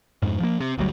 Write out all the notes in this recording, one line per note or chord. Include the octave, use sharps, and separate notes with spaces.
F2 G#2
F3 A#3
C3
G1 D2 F#3 G3